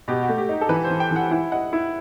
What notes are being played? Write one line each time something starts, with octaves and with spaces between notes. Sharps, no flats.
B2 G4
F#4
A3
G4
D#4
A4
E3 B4
C5
E3
G5
E3 F#5
E4 F#5
D#5 F#5
E4